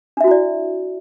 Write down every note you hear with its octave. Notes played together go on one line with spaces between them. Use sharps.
D4 E4 F#4 D5 E5